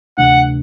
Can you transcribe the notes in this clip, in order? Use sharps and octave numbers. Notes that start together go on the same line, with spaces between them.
D2 C3 E3 A3 D4 F#5